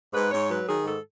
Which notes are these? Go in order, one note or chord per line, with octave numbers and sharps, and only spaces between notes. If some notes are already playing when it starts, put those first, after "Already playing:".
G#2 B4
G#2 C#5
F#3 B4
D#3 G#4
G#2 A4